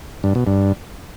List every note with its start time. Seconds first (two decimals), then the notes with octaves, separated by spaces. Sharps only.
0.24 G2
0.35 B2
0.47 G2